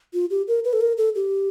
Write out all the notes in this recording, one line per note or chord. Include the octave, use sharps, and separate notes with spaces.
F4
G4
A#4
B4
A4
A#4
A4
G4